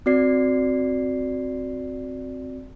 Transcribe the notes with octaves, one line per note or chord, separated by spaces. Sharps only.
C4 F#4 D5 C7